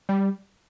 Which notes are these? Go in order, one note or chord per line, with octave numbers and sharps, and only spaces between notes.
G3